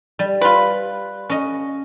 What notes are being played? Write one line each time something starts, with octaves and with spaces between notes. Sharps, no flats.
G3
F4 B4
C#4 D#5